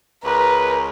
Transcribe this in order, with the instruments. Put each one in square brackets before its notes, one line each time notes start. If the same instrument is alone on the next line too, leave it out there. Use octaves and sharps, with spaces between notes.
[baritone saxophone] C#2 [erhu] A#4 [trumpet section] B4